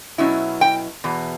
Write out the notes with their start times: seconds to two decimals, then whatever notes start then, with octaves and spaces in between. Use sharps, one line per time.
0.18 B2 F#3 C#4 E4
0.61 G5
1.04 E2 B2